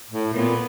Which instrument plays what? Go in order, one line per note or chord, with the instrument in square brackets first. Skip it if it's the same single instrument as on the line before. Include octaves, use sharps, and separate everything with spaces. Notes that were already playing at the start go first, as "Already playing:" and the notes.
[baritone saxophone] A2
[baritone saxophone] A#2 [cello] B3